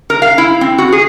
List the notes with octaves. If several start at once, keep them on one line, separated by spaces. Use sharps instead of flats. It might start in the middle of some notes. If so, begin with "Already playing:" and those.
A#4
F5
E4
C4
F#4
G#4